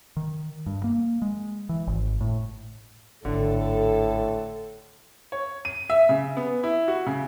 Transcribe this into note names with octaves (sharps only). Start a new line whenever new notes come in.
D#3
G2
A#3
G#3
E3
G#1
A2
G#1 A2 D3 A4
C#5
D#7
E5
C#3
B3
E4
F#4
C#3